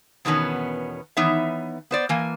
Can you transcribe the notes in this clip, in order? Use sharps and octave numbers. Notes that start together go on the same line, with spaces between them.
E2 B2 D#3 G#3 B3 C#4
D#3 E3 B3 D#4 C#5 E5
B3 C5 D5
E3 A#3 G#5